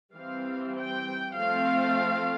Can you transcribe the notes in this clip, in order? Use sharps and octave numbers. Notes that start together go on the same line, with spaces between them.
E3 G3 C4 F5
G5
F3 A3 C4 F5